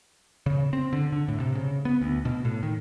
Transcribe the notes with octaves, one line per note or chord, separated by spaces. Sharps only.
C#3
C4
D3
D3
A2
C3
C#3
B3
D2
B2
A2
D#3